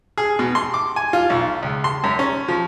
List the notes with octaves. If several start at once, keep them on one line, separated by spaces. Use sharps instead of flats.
G#4
B2
C6
D6
G#5
F4
B1
C#2
C6
F#2
C#4
F3